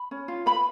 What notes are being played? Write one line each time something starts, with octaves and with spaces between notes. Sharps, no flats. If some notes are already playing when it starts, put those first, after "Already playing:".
Already playing: B5
C#4
F4
B4 B5